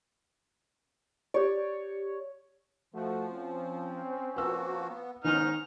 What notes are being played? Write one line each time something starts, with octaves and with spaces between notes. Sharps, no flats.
G4 C#5 D5
F3 A3 F#4
C4 C#4
F3 A#3 F#4 B4 E6
B3
G#2 D#3 B3 C#4 D#4 D#5 F6